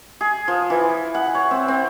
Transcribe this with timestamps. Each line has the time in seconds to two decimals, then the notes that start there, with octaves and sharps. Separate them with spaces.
0.21 G#4
0.48 F3
0.70 E3
1.14 F#5
1.35 C#5
1.51 C4
1.68 C4